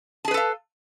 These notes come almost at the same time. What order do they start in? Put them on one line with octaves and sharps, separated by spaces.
A5 G#4 B4 A4 F5